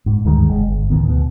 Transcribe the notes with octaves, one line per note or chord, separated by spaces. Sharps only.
G#2
D2 G2 D#3 G#3
F1 G#3
G1
C#2 A2 D#3 B3
D2 B2